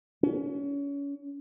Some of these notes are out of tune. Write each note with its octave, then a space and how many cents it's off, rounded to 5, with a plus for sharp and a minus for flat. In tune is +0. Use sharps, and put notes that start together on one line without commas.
C#4 +30